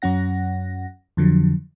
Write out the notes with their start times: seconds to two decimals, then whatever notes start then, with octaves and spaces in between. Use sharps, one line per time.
0.02 F#2 F#3 C#4 F#5 A#6
1.17 F2 D3 F3 F#3